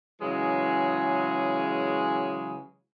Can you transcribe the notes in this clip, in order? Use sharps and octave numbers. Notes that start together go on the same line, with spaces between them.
C#3 E3 F#3 G#3 G#4